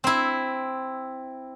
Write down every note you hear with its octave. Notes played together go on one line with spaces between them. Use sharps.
C4 E4